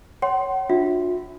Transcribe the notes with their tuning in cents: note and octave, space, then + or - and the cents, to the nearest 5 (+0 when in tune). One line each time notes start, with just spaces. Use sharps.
C#5 +0 F#5 +40 C6 +0
D4 +10 F4 +45 E5 -5